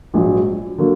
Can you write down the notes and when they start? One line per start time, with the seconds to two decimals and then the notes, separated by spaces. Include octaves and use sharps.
0.14 A#1 G#2 F#3
0.78 D3 F#3 A#3